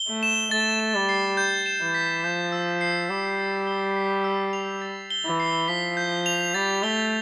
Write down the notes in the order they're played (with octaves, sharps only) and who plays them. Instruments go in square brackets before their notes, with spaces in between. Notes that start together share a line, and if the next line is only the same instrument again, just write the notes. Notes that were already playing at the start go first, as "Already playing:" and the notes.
Already playing: [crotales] G7
[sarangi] A3
[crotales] E7
[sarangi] A3 [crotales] A6
[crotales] E7
[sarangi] G3
[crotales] C7
G6
E7
[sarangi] E3
[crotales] B6
[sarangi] F3 [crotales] G6
[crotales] E6
C7
[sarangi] G3 [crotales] E7
[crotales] A6
G7
B6
E6
F7
A6
G7
[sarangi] E3
[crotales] C7
[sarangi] F3 [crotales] B6
[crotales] G6
F7
[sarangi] G3 [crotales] A6
[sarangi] A3 [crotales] G7